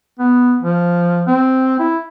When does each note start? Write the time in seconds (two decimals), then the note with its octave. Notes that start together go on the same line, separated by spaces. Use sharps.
0.19 B3
0.63 F3
1.27 C4
1.79 E4